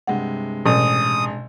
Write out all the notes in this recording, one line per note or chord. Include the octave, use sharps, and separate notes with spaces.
G2 C3 G#3 F#5
A1 B2 D#6